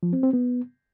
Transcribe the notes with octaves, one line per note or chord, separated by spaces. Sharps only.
F3
C4
C4
B3